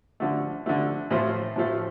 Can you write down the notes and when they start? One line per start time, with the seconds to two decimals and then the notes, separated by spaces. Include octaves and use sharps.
0.20 D3 F3 A3
0.66 D3 F3 A3
1.11 A2 F3 A3 F4 C5
1.56 A2 F3 A3 F4 C5